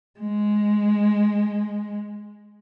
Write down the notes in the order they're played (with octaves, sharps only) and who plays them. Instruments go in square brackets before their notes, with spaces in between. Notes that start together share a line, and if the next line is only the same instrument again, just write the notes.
[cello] G#3